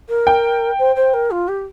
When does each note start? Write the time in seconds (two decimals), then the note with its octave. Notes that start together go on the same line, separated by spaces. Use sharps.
0.09 A#4
0.27 G5
0.79 C5
0.96 C5
1.14 A#4
1.31 F4
1.48 G4